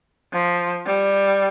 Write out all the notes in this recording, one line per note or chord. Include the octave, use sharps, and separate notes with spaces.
F3
G3